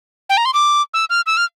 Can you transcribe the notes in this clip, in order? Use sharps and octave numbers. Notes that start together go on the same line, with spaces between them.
G5
A#5
C6
D6
E6
F6
E6
F6